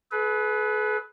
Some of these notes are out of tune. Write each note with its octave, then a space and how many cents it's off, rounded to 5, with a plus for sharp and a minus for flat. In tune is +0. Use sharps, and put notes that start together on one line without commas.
G#4 +45 B4 +0